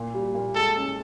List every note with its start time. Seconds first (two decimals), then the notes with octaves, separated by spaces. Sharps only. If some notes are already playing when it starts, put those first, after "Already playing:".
Already playing: A#2
0.14 G3
0.35 A#2
0.55 G#3 A4
0.76 C#4